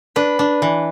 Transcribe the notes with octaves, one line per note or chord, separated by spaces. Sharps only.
D4 B4
D4
E3